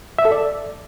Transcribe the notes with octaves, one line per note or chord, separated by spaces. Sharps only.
E5
A4
D5